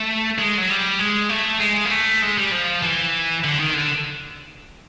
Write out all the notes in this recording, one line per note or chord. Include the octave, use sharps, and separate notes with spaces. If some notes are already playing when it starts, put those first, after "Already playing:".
Already playing: A3
G#3
F#3
G3
G#3
A3
G#3
A#3
A3
G#3
G3
F3
E3
D3
D#3
D3